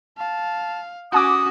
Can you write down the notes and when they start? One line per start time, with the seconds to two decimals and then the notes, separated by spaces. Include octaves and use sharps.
0.17 F5 A5
1.12 C#4 F#4 F#5 G#5 D6 D#6